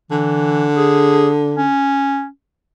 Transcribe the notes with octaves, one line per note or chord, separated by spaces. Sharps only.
D3 E3
G#4
C#4